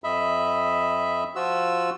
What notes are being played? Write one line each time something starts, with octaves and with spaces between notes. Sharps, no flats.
F2 D#5 E5 B5
F3 F4 F#4 E6